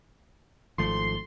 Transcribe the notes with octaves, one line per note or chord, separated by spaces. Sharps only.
G#1 F3 A3 C6